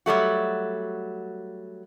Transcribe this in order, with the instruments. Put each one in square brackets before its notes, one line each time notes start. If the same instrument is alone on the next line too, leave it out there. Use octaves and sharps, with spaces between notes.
[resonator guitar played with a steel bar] F#3 G3 A3 F#4